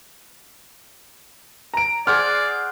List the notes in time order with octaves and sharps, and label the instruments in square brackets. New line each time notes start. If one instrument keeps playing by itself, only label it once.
[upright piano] A#5 D7
[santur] G#4 C5 F#5 [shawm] D5 [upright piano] F6